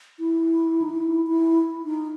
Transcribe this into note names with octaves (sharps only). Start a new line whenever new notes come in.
E4
D#4
E4
E4
D#4